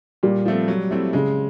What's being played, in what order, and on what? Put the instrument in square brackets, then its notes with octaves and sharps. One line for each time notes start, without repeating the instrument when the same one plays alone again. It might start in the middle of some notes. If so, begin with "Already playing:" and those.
[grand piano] A#2 [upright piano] G3
[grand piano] F3 A3 C4
F#3
A3 C4 E4
[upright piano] C#3 [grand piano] G#3